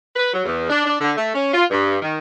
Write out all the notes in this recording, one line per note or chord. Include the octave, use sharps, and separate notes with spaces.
B4
F#3
E2
D4
D4
D3
A3
C#4
F4
G2
D#3